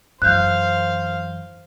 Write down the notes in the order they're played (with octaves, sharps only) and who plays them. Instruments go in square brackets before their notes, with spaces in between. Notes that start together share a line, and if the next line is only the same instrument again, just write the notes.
[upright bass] F#2 E3 [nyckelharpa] C5 F5 [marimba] F#6 G6